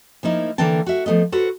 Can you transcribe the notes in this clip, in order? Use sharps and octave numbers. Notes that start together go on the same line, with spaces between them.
F3 A#3 D#4 E4
D3 E3 A#3 A4 G5 A5
F#4 E5
F3 F#3 A3 B3 D#5
F#4 A4 B4 C5